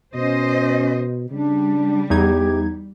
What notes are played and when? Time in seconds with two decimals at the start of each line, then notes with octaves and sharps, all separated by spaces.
0.15 B2 C#4 C5 D#5
1.31 C#3 G3 D4
2.10 E2 D#4 G4 G#6